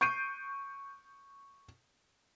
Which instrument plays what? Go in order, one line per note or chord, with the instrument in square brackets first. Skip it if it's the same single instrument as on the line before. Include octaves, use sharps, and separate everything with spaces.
[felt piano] C#6 G6 C7 D7 D#7